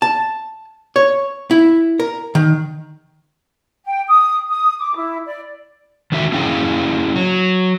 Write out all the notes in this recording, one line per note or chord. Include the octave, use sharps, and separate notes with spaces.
A5
C#5
E4
A#4
D#3
G5
D#6
D#6
D6
E4
D5
D#3 D4 F#4 E5
A#3 C#4 E4 G#4 F5 G5
F#3